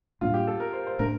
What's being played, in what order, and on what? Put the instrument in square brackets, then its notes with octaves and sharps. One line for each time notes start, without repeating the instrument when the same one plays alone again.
[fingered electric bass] A2 G3 A#3 D4 [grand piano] F4
[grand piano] G4
A4
A#4
C5
C5
[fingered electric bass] A2 A3 D4 [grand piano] A#4